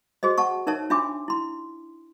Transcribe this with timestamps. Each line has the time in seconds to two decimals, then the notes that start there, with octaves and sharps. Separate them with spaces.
0.23 F#4 G#4 C5 D#5
0.38 F#5 A5 C#6
0.67 D#4 A#4 C#5 E5 A5
0.90 D4 F4 E5 G#5 C6 D6
1.28 E4 C6